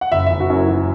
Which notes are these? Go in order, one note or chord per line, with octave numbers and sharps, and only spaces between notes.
F#5
F#1 E5
F#1 E5
F#4
F#2 E4
E3 F#4